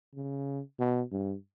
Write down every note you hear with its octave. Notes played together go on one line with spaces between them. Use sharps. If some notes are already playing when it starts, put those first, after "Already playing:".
C#3
B2
G2